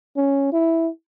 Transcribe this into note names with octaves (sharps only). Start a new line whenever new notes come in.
C#4
E4